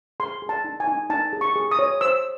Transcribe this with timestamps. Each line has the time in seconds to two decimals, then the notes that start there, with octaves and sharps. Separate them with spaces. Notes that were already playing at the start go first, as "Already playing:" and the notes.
0.20 G#4 C6
0.42 G#4
0.49 A5
0.64 D#4
0.80 G#5
0.88 D#4
1.10 D#4 A5
1.33 G#4
1.41 C#6
1.56 G#4
1.71 D#6
1.79 C#5
2.01 C5 E6